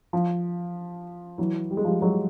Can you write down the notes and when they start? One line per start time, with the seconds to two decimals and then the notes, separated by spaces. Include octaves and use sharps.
0.13 F3
1.38 E3 F#3
1.71 G3
1.77 G#3
1.84 F3 G3
2.02 F#3 G#3